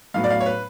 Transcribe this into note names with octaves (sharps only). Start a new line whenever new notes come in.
A2 F#3 B3 F5
D5
F5
C#5
B4